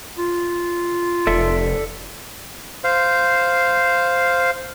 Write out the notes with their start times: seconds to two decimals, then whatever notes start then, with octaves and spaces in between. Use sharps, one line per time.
0.18 F4
1.27 F1 A4 D5 E5
2.84 C5 F5